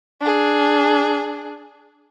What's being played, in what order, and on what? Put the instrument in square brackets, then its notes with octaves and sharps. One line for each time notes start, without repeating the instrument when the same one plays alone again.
[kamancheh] D4 G#4